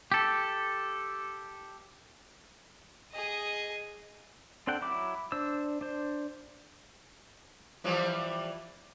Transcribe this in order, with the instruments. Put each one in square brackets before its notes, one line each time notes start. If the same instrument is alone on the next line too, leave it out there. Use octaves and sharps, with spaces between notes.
[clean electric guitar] G4 A4
[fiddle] G#4 D#5
[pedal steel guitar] C4 D4 A4 F#5 G5
F#3 E4 D6
D4 C5 E6
D4 C5
[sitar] E3 F3 G3